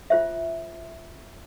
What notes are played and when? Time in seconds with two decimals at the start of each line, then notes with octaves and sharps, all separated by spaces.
0.10 F4 C5 E5